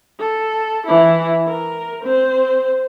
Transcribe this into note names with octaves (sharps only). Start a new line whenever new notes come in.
A4
E3 E4
A#4
C4 C5